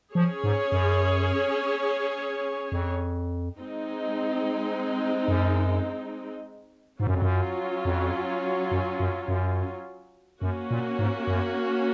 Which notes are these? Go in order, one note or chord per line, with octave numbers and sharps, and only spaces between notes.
F3 C#4 G#4 C#5
G#2
F#2
F2
G#3 C4 D#4
F#2
G#2 F#3 C#4 F4
F#2
F2
F#2
F2
F#2
F#2
F#2
F#2 A#3 C#4 F#4
A#2
G#2
F#2